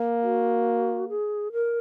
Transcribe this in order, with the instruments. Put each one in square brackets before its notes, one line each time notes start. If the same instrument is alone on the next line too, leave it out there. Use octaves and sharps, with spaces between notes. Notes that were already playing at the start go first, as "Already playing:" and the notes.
Already playing: [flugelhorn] A#3
[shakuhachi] F#4
G#4
A#4